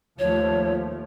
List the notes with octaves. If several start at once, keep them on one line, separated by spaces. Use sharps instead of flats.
D#2 F3 A3 C#5